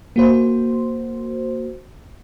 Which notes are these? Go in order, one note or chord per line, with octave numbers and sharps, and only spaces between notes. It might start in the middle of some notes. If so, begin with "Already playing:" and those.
A#3 F#4 C5